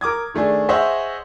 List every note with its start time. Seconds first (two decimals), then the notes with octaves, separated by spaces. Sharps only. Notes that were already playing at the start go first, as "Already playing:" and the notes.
0.01 A#4 D6 D#6 G#6
0.34 D#3 A3 D4 G#4
0.69 G#4 C5 C#5 D#5 E5 F#5